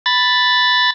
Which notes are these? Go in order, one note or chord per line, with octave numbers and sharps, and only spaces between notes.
B5 A6